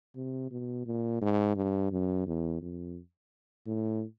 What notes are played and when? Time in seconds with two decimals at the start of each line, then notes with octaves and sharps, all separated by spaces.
0.16 C3
0.51 B2
0.86 A#2
1.21 G#2
1.56 G2
1.92 F#2
2.27 E2
2.62 F2
3.67 A2